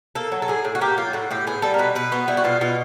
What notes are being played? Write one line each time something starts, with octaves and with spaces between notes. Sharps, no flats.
A#3 A4
F#3
A4
A2 G#4
A2
F#4
A#3 G4
F#3 F4
A2 F#4
A2 G4
B3 G#4
G3 A4
A#4
B2 B4
B2 B4
B3 F#4
G3 E4
F#4
B2 F4
B2 F4